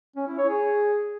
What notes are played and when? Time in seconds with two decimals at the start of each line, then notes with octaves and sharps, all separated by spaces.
0.16 C#4
0.27 E4
0.38 C#5
0.49 G#4